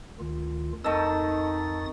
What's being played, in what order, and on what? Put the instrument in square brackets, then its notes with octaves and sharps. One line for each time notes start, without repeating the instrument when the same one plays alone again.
[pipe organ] D2 D#3 F4
[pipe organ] F2 D#6 A6 [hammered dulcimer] D#3 A3 [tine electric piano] D#5 A5 E6